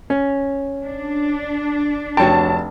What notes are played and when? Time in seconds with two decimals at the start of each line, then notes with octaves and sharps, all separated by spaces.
0.10 C#4
0.84 D4
2.17 F1 F#4 C#5 G5 A5